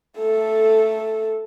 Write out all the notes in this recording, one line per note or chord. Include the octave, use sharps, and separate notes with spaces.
A3 A4